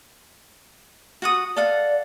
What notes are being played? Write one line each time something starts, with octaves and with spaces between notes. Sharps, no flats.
F#4 F#5 D#6
A4 D5 F5 F#5